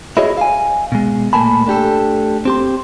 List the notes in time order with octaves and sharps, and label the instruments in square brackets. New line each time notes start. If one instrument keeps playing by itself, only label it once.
[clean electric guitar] E4 F#4 G#4 C#5 D#5
F5 G#5
B2 G#3
A#2 A3 A#3 G#5 A5 B5
A3 D4 G4 A4
C4 G4 C6